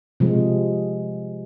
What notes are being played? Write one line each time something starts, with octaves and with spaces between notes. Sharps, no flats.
C3 F3 G#3